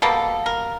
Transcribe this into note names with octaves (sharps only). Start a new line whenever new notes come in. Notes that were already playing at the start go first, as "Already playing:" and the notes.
B2 G3 A#3 A4
A#4